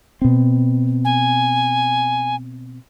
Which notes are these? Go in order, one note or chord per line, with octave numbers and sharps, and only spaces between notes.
B2 C4
G#5